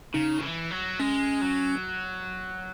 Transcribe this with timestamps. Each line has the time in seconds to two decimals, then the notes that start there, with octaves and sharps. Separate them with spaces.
0.14 C#3 D#4
0.38 D#3
0.42 E3
0.71 F#3
0.99 G#3 C#4
1.41 F#3